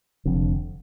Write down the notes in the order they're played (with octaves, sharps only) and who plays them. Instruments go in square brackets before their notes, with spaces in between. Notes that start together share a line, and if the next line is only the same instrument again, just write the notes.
[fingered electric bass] F1 F2 D3